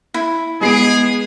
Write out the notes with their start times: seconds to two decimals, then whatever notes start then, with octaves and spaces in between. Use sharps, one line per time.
0.14 E4
0.61 G#3 B3 G#4 C7 D7